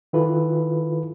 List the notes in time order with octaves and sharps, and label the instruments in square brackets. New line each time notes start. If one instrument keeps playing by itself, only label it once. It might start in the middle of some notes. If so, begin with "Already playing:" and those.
[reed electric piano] D#3 E4 F4 A4 B4